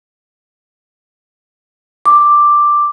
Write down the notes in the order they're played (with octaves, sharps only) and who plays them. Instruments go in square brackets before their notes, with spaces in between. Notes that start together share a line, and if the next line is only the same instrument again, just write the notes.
[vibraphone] D6